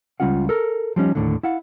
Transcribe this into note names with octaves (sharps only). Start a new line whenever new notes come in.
C#2 G3 C#4 F4 F#5
A4 A#4
F3 G3 C#4 D#4
D#2 A2 D3
E4 F5 F#5